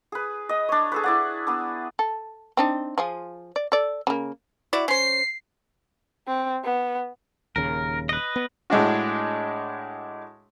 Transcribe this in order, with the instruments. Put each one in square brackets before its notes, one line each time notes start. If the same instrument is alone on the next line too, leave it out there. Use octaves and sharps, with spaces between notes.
[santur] G#4 B4
D#5 D#6
D4 C#5
G#4 A4 B4
E4 D5 F#5
B3 D4
[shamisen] A4
C4 D4 D#4
F3 F4 G#4
D5
A4 D5
C#3 A#3
[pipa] E4 F#4 D5
[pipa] C#4 C5 [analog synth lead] C7
[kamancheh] C4
B3
[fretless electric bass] D#1 D#2 C#3 [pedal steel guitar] A#4
[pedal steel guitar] B4 D#5
[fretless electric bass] B3
[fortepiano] A2 G#3 D4 F#4